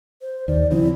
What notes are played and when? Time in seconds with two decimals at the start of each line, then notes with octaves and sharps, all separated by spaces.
0.21 C5
0.48 D#2 D#3 D5
0.71 C#3 F3 C4 E4